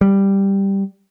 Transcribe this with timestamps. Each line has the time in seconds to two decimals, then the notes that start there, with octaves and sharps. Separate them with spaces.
0.01 G3